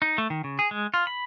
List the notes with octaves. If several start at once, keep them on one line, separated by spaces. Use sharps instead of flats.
D#4
A3
D#3
C#3
G#4
G#3
F4
B5